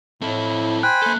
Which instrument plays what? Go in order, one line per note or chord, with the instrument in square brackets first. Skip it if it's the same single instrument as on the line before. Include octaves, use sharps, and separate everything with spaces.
[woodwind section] A2 [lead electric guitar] C4 A4 [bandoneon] E4
[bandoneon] C5 G#5 B5 [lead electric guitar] G5 [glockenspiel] F#6
[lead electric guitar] A#3 A4